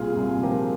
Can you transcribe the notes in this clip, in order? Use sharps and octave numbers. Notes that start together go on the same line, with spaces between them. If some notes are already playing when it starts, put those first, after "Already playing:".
Already playing: C2 A#2 F4 G#4
C2
F3 G4 A#4